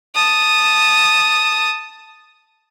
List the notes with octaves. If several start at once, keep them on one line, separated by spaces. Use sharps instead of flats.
A5 D#6